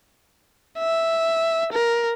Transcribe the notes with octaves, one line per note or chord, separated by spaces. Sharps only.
E5
A#4